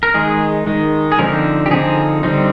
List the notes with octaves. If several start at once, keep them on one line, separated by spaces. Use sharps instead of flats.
A#4
D#3 G#3 D#4 G#4
D#3 G#3 D#4
G#4
D3 F3 C4 D#4 A#4
G4
D3 F3 C4 D#4 G#4
D3 G3 C4 D#4